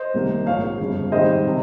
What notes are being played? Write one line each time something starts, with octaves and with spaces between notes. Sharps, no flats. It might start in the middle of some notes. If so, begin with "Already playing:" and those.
Already playing: C5 D#5
C2 C3 D#3 A#3
A#1 G#2 F3 C#5 F5
G1 F2 C#3
G#2 D#3 G3 C4 C5 D#5
C3